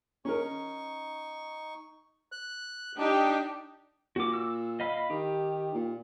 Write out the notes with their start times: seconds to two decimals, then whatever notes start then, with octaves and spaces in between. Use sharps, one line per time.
0.25 C#4 D#4 A#4 C#6
2.32 F#6
2.98 D4 D#4 G4 G5
4.16 A#2 F#4 D6
4.34 E6
4.80 D#5 F5 B5
5.10 D#3 G4
5.74 A#2